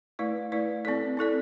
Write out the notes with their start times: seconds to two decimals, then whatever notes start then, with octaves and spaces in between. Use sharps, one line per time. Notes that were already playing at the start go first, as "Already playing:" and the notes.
0.19 A3 E4 B4 D5
0.52 A3 E4 B4 D5
0.85 C4 E4 A4 D5
1.17 C4 E4 A4 D5